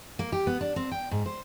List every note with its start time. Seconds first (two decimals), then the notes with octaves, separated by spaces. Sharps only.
0.19 A#3
0.32 G4
0.47 B3
0.61 D4
0.76 C4
0.91 G5
1.11 G#2
1.26 C5